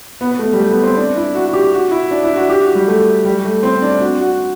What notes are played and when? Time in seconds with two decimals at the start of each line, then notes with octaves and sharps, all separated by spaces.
0.21 B3
0.31 B3
0.39 A3
0.53 G3
0.59 A3
0.71 B3
0.83 C4
0.97 D4
1.16 E4
1.35 F#4
1.46 F#4
1.53 G4
1.73 F#4
1.91 E4
2.11 D4
2.23 E4
2.36 F#4
2.50 G4
2.62 F#4
2.75 G3
2.88 A3
3.25 G3
3.45 A3
3.63 C4
3.82 D4
4.01 F#4
4.21 F#4